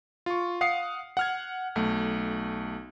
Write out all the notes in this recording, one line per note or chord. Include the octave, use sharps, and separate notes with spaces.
F4 C#6
F5 F#5 D#6 C7 C#7
F#5 F6 G#6
B1 A3